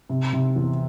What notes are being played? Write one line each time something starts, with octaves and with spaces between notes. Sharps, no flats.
C3
C3
E2